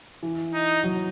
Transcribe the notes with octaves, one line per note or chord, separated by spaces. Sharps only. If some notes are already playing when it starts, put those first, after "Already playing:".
E3
D#4
F#3